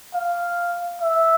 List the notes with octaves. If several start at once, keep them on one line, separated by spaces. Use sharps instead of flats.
F5
E5